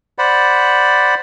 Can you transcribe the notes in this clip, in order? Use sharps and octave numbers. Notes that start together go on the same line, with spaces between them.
C5 D5 F#5 B5